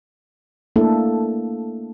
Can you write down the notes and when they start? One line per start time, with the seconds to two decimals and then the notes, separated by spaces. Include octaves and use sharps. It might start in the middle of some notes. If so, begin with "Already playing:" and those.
0.76 A3 A#3 D4 E4 A4